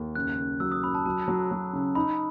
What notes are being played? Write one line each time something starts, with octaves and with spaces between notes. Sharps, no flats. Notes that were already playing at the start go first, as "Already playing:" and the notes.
Already playing: D#2
F#1 F#6
F#1
F#3 E6
D#6
F#2 B5
A5
F#3 A5
F#3
F#3
C#3
D#4 B5